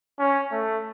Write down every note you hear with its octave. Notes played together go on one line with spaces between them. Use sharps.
C#4
A3